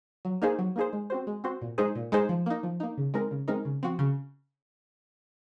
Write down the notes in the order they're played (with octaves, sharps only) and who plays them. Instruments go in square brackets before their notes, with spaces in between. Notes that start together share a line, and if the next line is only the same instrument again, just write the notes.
[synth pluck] F#3
A#3 D#4 G#4 C5
F#3
A#3 D#4 G#4 C5
G#3
C4 F#4 C5
G#3
C4 F#4 C5
A#2
G#3 D#4 G#4 C5
A#2
G#3 D#4 G#4 C5
F3
A#3 D#4
F3
A#3 D#4
C#3
G#3 C4 D#4 A#4
C#3
G#3 C4 D#4 A#4
C#3
F3 C4 F#4
C#3